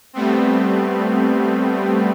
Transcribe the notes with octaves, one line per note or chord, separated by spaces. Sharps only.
G3 A3 B3 C4